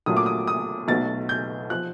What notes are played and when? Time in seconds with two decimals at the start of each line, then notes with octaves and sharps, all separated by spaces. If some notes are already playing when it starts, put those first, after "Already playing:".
0.06 A#1 A#2 F#3 A3 D#6
0.17 D6
0.26 D#6
0.47 D#6
0.88 B1 B2 F#3 A3 A6
1.29 G6
1.70 F3 F#6